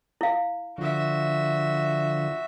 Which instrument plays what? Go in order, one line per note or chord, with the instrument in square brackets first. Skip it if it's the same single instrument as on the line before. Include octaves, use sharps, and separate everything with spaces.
[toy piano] E4 F5
[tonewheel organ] D3 F3 [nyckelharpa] F#4 E5